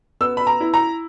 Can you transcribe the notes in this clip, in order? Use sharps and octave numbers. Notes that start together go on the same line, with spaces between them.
B3 E6
B5
A#5
E4
A#5